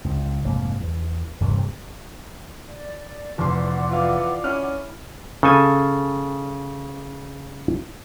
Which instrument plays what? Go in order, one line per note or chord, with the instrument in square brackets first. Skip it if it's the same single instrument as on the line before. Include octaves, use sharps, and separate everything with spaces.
[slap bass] C#2
F1 G#2 A#3
E2
D#1 G2 C3 E3
[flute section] D5
[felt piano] F1 C6 [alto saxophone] E3 [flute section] D5 F#5 D6
[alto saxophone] E3 [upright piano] F4 F5
[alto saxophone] C#4 [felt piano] E4 F6
[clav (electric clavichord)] C#3 A4 G#5